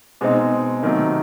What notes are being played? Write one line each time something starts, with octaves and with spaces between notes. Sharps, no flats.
B2 G#3 C4 D#4
C3 D#3 F#3 A3